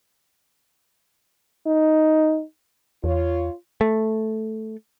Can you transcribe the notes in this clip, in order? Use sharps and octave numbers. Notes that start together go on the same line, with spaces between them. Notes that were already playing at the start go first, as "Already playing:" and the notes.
D#4
E2 F4 C#5
A3